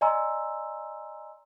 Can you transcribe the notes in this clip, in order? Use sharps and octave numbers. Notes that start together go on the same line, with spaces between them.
D5 D#5 G#5 A#5 C6 E6